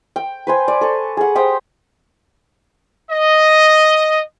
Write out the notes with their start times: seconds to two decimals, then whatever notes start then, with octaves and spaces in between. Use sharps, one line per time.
0.16 G5
0.47 B4 C5 G#5
0.68 D5
0.81 A4 C#6
1.17 G#4 F#5
1.35 G4 C5 G5 D#6
3.11 D#5